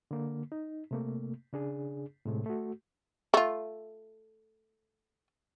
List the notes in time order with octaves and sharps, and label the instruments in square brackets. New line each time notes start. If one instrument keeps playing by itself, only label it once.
[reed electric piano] D3 A#3
D#4
C3 A3 A#3
C#3 D4 G#4
A2 C3 G#3 A3
A3 F#4
[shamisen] A3 F4